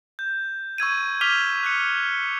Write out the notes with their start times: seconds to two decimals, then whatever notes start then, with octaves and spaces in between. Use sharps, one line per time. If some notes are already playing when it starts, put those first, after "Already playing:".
0.19 G6
0.78 C#6 E6 G#6 D#7
1.21 D6 F6 B6 D#7 F7 G7
1.63 F#6 B6 C#7